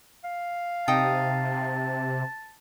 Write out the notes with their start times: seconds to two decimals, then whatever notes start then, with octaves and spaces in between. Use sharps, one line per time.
0.24 F5
0.88 C3 D#4 G5 A5 D#6